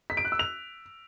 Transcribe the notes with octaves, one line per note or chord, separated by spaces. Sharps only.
B6
D7
F#6
E6
F7